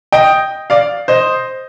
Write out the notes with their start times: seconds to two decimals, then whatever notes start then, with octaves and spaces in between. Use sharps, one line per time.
0.12 D#5 G5
0.70 D5 F5
1.08 C5 D#5